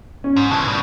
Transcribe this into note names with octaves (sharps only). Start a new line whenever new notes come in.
C#4
G#2
C#3 E3 A5 C#6
B2 G3